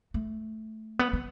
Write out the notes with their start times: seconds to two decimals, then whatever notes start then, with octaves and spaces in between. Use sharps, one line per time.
0.14 A3
0.99 B3
1.13 B3